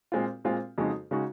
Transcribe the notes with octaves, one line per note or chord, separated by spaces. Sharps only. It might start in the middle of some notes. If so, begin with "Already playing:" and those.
A#2 G#3 C4 F4
A#2 G#3 C4 F4
F2 C#3 G#3 D#4 F#4
C#3 G#3 D#4 F#4